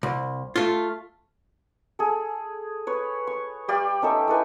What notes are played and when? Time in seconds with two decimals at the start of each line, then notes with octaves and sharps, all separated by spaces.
0.03 C2
0.56 A3 F4
1.99 G#4 A4
2.87 B4 C#5
3.27 C#6
3.68 G3 G4 D5 F5
4.02 C#4 D#4 A4 E5
4.28 E4 A4 B4 G#5